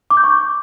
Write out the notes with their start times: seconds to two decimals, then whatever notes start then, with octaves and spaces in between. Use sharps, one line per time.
0.10 D6
0.17 G6
0.24 C#6